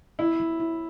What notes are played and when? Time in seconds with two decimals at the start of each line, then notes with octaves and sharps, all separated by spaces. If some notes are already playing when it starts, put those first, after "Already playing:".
0.19 B3 E4
0.40 F#3
0.60 E4